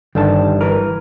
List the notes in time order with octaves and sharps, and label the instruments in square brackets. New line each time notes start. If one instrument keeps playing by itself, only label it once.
[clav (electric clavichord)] G1 G3 A5 [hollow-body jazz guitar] D#3 D4
[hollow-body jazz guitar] E3 A#4 B4